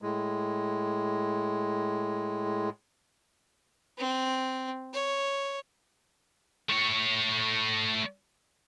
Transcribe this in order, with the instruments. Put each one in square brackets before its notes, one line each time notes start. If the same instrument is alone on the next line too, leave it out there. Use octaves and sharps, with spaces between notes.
[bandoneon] A2 G#3
[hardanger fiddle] C4
C#5
[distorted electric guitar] A3 C#5